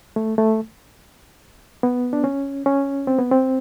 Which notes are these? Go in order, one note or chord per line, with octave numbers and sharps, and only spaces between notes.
A3
A3
B3
D4
C#4
C#4
C4
B3
C4